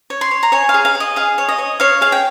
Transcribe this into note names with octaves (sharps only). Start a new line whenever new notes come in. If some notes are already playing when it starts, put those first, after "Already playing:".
C#5
C6
C#5
A#5
C#5 G#5
F5
G#4
F5
G#4
D#5
G#4 F5
C#5
D#5
C#5
C#5 F5
G#4 F5
G5